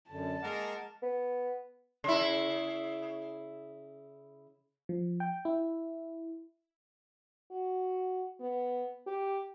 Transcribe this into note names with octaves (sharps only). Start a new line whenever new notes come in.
F#2 D3 A5
G#3 A#3 G#4 A#4 F#5
B3
C#3 E4
F3
G5
E4
F#4
B3
G4